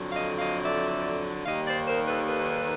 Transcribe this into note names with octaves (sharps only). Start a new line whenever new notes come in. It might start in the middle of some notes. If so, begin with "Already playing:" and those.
Already playing: F2 D3 F#3
D#5 F5
D#5 F5
D5 E5
D#2 D#3 G3 A#3 D#5 F5
C5 D5
A#4 C5
A4 B4
A4 B4